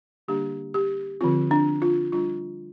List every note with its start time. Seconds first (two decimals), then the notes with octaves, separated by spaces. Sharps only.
0.28 D3 G3 A#3 D4 G4
0.74 G4
1.21 D3 F3 C4 F4
1.51 D4
1.82 F4
2.12 G3 D4 F4